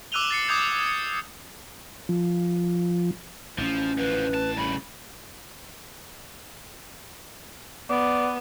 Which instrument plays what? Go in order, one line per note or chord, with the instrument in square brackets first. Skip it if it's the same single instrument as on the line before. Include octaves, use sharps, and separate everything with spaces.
[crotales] D6 E6 F#6 D#7 F7 G7
A6 C7 C#7
D6 D#6 G6 G#6
G#6 C#7
[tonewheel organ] F3
[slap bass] A1 C#4 [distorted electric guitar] F3
[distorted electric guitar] D2 F3 [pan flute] B4
[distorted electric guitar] F2 A5
[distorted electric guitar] G2 C#3 [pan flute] B5
[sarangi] B3 [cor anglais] D5